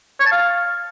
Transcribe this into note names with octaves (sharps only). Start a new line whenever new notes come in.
C#5
A5
F5